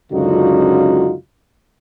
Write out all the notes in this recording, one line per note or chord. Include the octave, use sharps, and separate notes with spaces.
C#2 F#2 D3 D#4 F4 F#4